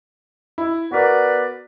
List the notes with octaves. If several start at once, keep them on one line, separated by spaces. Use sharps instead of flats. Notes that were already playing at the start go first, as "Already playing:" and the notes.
E4
B3 F#4 A#4 B4 D5